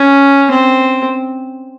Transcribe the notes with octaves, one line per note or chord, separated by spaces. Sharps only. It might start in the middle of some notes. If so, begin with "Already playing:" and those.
Already playing: C#4
C4